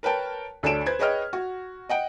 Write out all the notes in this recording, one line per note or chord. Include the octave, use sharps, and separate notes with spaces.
A#4 B4 C#5 G5 A5
D2 D4 A4 C#5 D7 E7
B4 C5 G#6
G#4 B4 C#5 D#5 G5 F6
F#4
D#5 F#5 G5